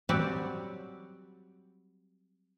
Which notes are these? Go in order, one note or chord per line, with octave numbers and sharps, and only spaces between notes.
F#3 G3 C4 F#4 G4 D5